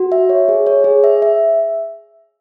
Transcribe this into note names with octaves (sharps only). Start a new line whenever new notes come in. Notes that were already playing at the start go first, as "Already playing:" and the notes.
Already playing: F#4
E5
C#5
G#4
C#5
G#4
E5
E5